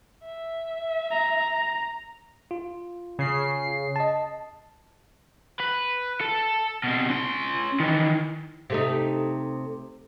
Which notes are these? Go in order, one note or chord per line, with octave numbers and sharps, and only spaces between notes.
E5
A#5
F4
C#3 C7
D#5 A5
B4
A4
B2 C4
C#4 C6
D#3 E3
C3 A3 D#4